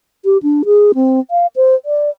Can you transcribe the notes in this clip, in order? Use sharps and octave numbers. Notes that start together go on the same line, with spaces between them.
G4
D4
G#4
C4
F5
C5
D5